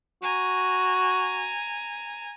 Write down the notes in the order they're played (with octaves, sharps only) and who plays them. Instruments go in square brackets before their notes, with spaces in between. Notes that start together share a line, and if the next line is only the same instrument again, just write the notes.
[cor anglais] F#4 [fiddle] G#5 A#5